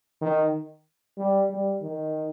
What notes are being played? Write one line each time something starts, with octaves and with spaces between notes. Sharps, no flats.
D#3
G3
G3
D#3